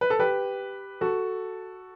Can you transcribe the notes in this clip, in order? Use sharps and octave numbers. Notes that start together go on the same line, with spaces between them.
B4
A4
G4 B4
F#4 A4